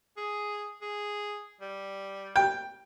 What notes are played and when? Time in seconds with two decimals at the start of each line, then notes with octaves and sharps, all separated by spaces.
0.17 G#4
0.82 G#4
1.61 G3
2.36 G5